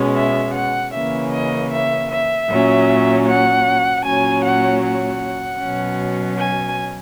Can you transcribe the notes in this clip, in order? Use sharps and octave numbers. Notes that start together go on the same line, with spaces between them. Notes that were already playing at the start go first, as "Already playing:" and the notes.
Already playing: B2 G#3 C#4
E5
F#5
C#3 E3 A#3 C#4 E5
D#5
E5
E5
A#2 F#3 C#4
F#5
A#2 F#3 C#4 G#5
F#5
F#5
B2 F#3 C#4
G#5